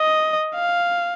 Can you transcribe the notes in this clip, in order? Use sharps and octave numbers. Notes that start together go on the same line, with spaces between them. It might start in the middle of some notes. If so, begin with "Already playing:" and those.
Already playing: D#5
F5